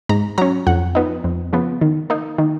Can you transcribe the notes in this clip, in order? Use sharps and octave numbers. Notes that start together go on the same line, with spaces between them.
G#2 A#5
F#3 C#4 A#5
F2 F#5
F3 B3 D#4
F2
C#3 F3 B3
D#3
A#3 D#4
D#3